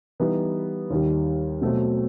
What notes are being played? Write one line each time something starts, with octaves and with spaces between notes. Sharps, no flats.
E3 G3 B3 D#4
D#2 D#3 G3
B2 F#3 A3 C4